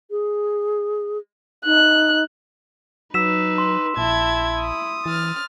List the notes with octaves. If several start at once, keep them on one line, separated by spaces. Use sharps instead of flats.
G#4
D#4 F#6
F#3 D#4 B4 E6 B6 E7
C6
A#1 E4 A5 G#6
D#6
E3 F6 A6